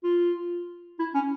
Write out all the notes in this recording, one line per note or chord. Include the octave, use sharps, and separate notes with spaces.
F4
E4
C#4